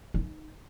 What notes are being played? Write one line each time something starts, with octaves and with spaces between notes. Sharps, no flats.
D#4